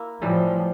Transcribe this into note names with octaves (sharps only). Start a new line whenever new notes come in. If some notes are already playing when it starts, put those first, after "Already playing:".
Already playing: A#3 E4
A2 E3 F3 G3